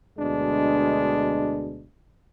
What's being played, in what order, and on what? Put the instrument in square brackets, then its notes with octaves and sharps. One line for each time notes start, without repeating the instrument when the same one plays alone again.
[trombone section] D2 B2 G#3 D4